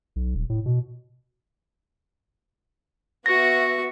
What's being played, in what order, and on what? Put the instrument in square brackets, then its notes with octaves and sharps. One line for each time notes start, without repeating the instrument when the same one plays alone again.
[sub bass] B1
D#1
A2
B2
[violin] B3 E5 [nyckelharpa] F#4 C#6 [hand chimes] A#6